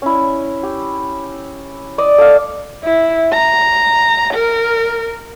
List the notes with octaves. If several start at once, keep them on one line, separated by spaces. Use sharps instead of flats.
C#4 E4
G4
D5 D#5
A4 F5
E4
A#5
A#4